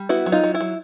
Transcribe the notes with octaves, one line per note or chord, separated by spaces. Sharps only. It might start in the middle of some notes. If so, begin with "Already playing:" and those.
Already playing: G3
B3 E4 F#4
F#3
D#4 F4
F#3
E4
F#3